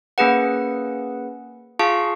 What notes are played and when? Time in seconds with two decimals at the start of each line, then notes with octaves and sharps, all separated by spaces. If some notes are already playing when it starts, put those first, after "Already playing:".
0.18 A#3 C#4 G#4 B4 F#5
1.79 F4 G#4 F5 A5 C#6